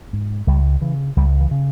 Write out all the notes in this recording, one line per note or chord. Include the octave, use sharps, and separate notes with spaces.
G#2
C#2 G3
C#3 E3
C#2 G3
E3
C#3